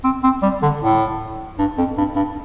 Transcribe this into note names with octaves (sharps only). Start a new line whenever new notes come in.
C4
C4
G3
D3
A2
G2
F2
G2
G2